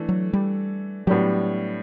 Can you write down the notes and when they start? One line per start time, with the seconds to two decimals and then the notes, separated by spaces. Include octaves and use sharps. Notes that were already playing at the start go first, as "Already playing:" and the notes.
Already playing: E3 A3 D4 A4
0.09 F#3
0.33 G3
1.07 A2 F#3 G3 B3 D4 G4